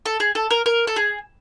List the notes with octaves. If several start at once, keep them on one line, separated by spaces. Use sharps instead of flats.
A4
G#4
A4
A#4
A#4
A4
G#4